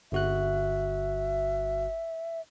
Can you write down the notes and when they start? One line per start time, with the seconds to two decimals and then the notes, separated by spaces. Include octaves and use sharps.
0.12 G1 F#4 E5 F#6